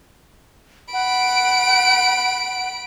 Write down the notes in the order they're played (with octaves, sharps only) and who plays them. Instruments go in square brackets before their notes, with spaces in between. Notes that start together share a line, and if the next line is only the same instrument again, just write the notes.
[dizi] F#5 [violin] B5 D7